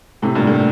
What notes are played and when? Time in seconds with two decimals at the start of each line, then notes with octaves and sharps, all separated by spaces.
0.22 A2 C3
0.35 G2 A#2
0.47 A2